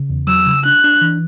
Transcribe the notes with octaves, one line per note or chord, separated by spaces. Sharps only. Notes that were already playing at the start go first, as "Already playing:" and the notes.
Already playing: C#3
E2
F#3 E6
C#3
D4 F#6
D4
E3